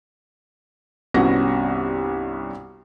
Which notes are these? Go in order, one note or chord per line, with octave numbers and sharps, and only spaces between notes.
C2 G2 B3 C#4 F#4 A#6